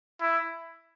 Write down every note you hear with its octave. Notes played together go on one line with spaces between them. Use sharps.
E4